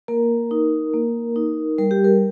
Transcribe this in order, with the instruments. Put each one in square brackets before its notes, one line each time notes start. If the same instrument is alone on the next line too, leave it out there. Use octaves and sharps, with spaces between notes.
[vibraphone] A#3 A#4
D#4
A#3
D#4
G3 A#4
G4
A#4